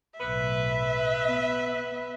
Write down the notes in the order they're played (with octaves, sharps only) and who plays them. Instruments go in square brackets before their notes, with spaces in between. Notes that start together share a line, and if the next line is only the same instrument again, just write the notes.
[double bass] B1 A2 [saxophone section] B4 [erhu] E5
[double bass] B3